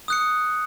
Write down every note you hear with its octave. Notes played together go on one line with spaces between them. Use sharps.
D#6 F#6 C#7